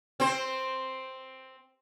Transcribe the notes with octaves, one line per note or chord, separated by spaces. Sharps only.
C4 C5